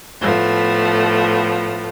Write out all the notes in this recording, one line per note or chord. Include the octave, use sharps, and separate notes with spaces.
A2 F3 A3 B3